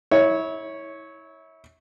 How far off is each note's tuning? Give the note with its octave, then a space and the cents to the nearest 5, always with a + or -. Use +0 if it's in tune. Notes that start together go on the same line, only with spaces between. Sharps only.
E4 -30 C#5 +0